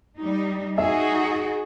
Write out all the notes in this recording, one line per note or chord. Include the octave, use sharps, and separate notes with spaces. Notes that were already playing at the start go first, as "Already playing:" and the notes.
G3 D#4
D#4 F#4 G#4 E5